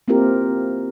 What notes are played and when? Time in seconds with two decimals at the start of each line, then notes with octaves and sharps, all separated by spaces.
0.08 A#3 C4 E4 F4 G4 A#4